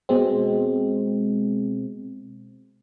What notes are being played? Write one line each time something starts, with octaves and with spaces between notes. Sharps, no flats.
B2 G#3 C4